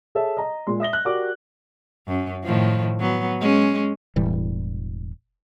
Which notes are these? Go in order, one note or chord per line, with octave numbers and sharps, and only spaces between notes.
G#4 A4 C#5 E5 A5
D#5 A#5
A#2 G#3 C6
E5 D#6 A#6 G7
F#6
F#4 G4 A#4 D5 D6
F#2
A2 D#3 F3
F#3 B3
G#3 C#4
E1 A2 E3 G3